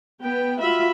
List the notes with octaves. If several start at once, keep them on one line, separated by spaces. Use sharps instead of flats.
B3 G5
F4 F#4 E5 B5